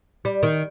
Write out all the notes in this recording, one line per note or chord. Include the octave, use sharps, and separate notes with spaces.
G3
D#3